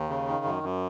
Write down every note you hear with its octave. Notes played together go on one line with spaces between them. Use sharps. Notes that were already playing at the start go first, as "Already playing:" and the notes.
Already playing: D#2
C#3
D#3
F#2
F#2